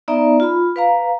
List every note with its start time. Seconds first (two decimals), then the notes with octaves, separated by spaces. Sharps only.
0.08 B3 D#4 D5 E5 A#5
0.40 F4 B5
0.76 B4 F5 A#5